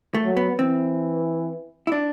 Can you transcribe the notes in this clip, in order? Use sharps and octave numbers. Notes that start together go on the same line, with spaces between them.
A3
F#3
B3
E3 C4
E4
D4